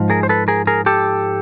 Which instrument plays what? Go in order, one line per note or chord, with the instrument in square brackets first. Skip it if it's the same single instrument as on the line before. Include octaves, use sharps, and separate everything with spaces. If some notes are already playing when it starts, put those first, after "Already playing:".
Already playing: [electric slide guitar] G#2 F3
G#4 A#4
C5
A4 B4
G#4 A#4
G#4 A#4
G4 A4